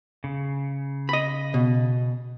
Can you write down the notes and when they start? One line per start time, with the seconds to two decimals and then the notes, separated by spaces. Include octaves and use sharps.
0.24 C#3
1.09 D#5 B5
1.54 B2